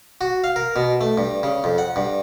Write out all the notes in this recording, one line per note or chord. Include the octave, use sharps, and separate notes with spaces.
F#4
F5
A#4
B2
A3
G2
C#3
F2
F#5
G2